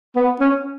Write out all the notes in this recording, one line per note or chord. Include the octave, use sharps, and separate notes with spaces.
B3
C#4